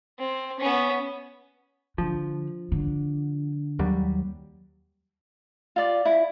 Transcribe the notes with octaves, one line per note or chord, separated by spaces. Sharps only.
C4
B3 C#4
D3 F3
D3
D#2 F#3 G3
F4 D5
E4